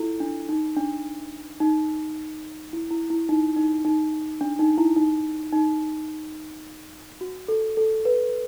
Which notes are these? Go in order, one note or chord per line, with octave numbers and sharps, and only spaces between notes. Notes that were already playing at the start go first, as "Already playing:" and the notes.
Already playing: E4 F4 A4
D4
D#4
D4
D#4
E4
E4
E4
D#4
D#4
D#4
D4
D#4
E4
D#4
D#4
F#4
A4
A4
B4